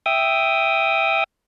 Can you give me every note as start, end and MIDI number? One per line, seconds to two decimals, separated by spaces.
0.06 1.24 76
0.06 1.24 79
0.06 1.24 87